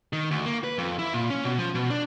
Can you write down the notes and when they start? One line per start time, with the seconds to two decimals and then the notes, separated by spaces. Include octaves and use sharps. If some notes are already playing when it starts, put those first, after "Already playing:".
0.13 D#3
0.31 D2
0.46 A#3
0.64 B4
0.78 F2
0.99 E4
1.13 A#2
1.30 C#4
1.45 B2
1.59 F3
1.75 B2
1.90 D4